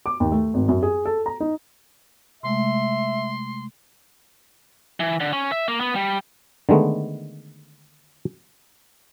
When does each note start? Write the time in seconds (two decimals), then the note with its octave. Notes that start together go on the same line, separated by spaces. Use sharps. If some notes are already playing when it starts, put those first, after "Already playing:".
0.06 D6
0.20 D#2
0.32 A3
0.54 G#1
0.68 F#2
0.83 G#4
1.05 A4
1.26 A#5
1.40 D#4
2.43 C3 G#3 A3 E5 C6
5.00 E3
5.20 D3
5.33 C#4
5.52 E5
5.68 A#3
5.80 B3
5.95 G3
6.69 D3 D#3 G#3 A3 B3